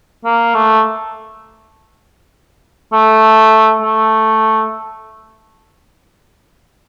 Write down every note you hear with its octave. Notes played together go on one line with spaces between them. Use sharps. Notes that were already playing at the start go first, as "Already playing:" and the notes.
A#3
A3
A3
A3